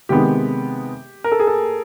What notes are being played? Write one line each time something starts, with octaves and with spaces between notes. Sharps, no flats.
C3 D#3 G#3 B3 D#4 G4
A#4
A4
G#4
A4